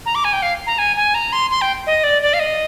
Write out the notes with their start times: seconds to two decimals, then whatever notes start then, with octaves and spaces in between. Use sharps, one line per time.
0.06 A#5
0.15 D6
0.24 G#5
0.33 G5
0.43 F5
0.67 A#5
0.78 G#5
0.97 G#5
1.15 A#5
1.33 C6
1.51 C6
1.61 G5
1.87 D#5
2.04 D5
2.22 D5
2.34 F5
2.39 D#5